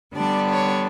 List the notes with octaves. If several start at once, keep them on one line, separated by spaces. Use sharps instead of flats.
D3 G3 B3 D4 D5
C#5